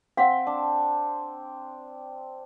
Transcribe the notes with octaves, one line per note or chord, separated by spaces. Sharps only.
C4 F5 F#5
D4